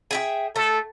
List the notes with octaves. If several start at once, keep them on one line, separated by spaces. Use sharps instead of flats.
G#4 E5 G5
A3 A4